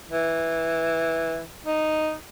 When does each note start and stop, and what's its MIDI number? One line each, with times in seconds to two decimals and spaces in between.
0.10 1.42 52
1.65 2.14 63